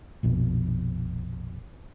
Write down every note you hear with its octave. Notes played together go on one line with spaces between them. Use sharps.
A#1 F2 B2